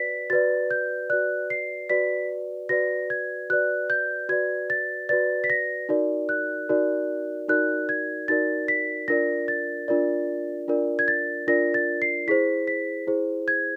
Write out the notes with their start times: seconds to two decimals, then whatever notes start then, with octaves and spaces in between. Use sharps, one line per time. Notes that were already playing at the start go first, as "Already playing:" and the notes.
Already playing: F#4 B4 D5 B6
0.30 F#4 B4 D5 A6
0.71 G6
1.10 F#4 B4 D5 F#6
1.50 C7
1.89 F#4 B4 D5 B6
2.69 F#4 B4 D5 A#6
3.10 G#6
3.50 F#4 B4 D5 F#6
3.90 G6
4.29 F#4 B4 D5 G#6
4.70 A6
5.09 F#4 B4 D5 A6
5.44 B6
5.50 A#6
5.89 D#4 F#4 A#4 D5
6.29 F#6
6.69 D#4 F#4 A#4 D5
7.48 D#4 F#4 A#4 D5 F#6
7.89 G#6
8.28 D#4 F#4 A#4 D5 A6
8.68 B6
9.08 D4 F4 A#4 D5 A#6
9.48 A6
9.88 D4 F4 A#4 D5
10.68 D4 F4 A#4 D5
10.99 G#6
11.08 A6
11.48 D4 F4 A#4 D5 A#6
11.74 A6
12.02 C7
12.27 E4 G#4 C5 B6
12.67 B6
13.07 E4 G#4 C5
13.48 G#6